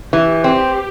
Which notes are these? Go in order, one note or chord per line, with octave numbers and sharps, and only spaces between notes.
E3 G4
C4